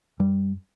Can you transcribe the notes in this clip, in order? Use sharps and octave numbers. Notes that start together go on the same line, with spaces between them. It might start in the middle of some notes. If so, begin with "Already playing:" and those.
F#2 G3